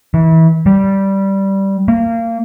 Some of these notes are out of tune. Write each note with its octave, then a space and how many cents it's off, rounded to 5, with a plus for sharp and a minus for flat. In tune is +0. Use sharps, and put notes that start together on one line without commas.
E3 -25
G3 -10
A#3 -25